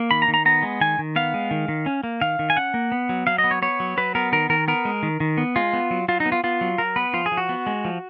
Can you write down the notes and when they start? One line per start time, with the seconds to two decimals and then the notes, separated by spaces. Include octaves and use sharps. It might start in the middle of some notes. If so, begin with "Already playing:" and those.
Already playing: A#3
0.11 D#3 B5
0.22 A#5
0.28 D#3
0.34 A#5
0.45 B3 A#5
0.63 G#3
0.81 D#3 G#5
0.99 D#3
1.16 B3 F5
1.34 G#3
1.51 D#3
1.68 D#3
1.86 C#4
2.03 A#3
2.21 D#3 F5
2.39 D#3
2.50 G#5
2.56 C#4 F#5
2.74 A#3
2.92 B3
3.09 F#3
3.27 F#3 F5
3.38 D#5
3.44 B3
3.51 C#5
3.62 B3 C#5
3.80 F#3
3.97 F#3 B4
4.15 B3 A#4
4.32 D#3 A#4
4.50 D#3 A#4
4.68 B3 A#4
4.85 G#3
5.03 D#3
5.20 D#3
5.38 B3
5.56 G#3 F4
5.73 B3
5.91 F#3
6.08 F#3 F4
6.20 D#4
6.26 B3
6.32 F4
6.44 B3 F4
6.61 F#3
6.78 F#3 A#4
6.96 B3 B4
7.13 F3 F4
7.26 G#4
7.32 F3
7.37 F#4
7.49 B3
7.67 G#3
7.85 F3